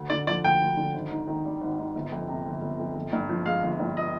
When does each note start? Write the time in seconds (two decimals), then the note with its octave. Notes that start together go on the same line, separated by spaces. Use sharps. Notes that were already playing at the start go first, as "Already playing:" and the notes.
Already playing: D2
0.10 D3 D5
0.27 F3 D5
0.44 D2 G5
0.61 D2
0.77 D3
0.94 G#1
1.10 G#2
1.27 D#3
1.45 G3
1.61 G#1
1.78 G#2
1.95 G1
2.12 F2
2.28 C3
2.45 G1
2.62 G1
2.79 F2
2.95 G1
3.13 G2
3.29 F3
3.45 G#3 F5
3.63 G1
3.80 G2
3.97 D#5